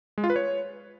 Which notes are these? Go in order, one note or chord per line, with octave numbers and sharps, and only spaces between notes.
G#3
F4
B4
C#5